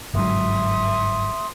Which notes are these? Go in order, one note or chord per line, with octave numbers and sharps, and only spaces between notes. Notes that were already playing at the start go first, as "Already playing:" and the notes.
G1 G#2 F#3 E5 C6 D#6